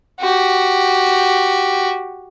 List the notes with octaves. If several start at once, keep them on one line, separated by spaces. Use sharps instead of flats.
F#4 G4